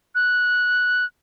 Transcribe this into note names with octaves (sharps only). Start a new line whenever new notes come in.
F#6